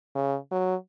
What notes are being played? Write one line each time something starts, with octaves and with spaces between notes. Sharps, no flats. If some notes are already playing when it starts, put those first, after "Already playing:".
C#3
F#3